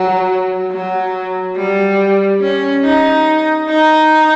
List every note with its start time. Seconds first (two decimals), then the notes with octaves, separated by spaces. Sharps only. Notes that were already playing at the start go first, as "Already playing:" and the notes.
Already playing: F#3
0.72 F#3
1.56 G3
2.41 C#4
2.84 D#4
3.69 D#4